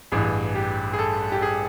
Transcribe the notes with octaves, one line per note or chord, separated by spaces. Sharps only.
A1 G2 E3 G#4
G4
G#4
A4
G4
G#4